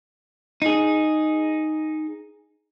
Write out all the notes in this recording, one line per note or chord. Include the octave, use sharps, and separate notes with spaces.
D#4 G#4